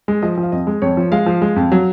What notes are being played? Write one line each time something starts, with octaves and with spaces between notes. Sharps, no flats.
G#3
F3 D#5
F3
F5
F2 D#5
G#3
F2 C#5
F3
G#3 F5
F3
G#3
F2
F#3